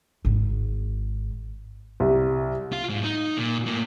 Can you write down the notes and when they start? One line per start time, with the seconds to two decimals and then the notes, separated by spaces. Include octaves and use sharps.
0.25 G#1 G#2
2.00 C2
2.73 F4
2.89 G#2
3.04 D#4
3.37 A#2
3.66 A2 A#3